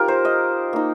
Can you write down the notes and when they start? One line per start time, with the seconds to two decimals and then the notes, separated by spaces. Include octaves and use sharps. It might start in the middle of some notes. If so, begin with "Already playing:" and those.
Already playing: F3 D#4 F4 G4 A#4
0.08 C5
0.25 D#5
0.73 A#3 D#4